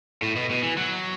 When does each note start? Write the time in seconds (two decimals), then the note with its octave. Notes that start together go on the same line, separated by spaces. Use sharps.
0.22 A2
0.36 B2
0.50 B2
0.63 E3
0.77 F#3